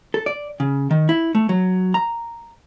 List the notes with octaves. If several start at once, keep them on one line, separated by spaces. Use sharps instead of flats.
A4
D5
C#3
D#3
E4
A3
F#3
A#5